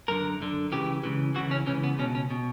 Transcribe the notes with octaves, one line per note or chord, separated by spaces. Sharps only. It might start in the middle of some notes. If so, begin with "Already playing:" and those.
F#2 D3 A#4
F#2 D3
C#2 C#3 E3 G4
C#2 C#3 E3
C#2 C#3 E3 F#4
C#4
C#2 C#3 E3 C#4
B3
C#2 B2 C#4
C#4
B2